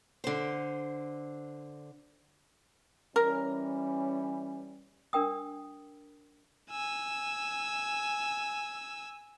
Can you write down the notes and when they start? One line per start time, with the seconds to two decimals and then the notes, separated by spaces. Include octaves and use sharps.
0.24 D3 C5
3.16 E3 G3 C#4 A#4
5.13 D4 A#4 G5 D#6
6.70 G#5 E6